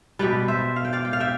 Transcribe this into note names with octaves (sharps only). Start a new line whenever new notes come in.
B2 G3 B4 D5
C5 E5
F5
G5
D5 F5
G5
F5
E5 G5